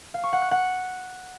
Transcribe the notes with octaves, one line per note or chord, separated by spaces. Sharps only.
F5
C#6
F#5
F#6
F#5